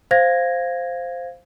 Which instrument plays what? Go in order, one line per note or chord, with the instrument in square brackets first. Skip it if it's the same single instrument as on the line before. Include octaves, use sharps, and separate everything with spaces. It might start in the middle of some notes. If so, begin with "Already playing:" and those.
[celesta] C5 F5 G#6 A#6